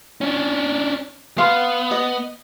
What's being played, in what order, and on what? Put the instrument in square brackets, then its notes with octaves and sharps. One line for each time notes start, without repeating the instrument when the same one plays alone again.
[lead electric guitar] C#4 D4
[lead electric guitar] B3 [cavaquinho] F5 C6
[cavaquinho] D#5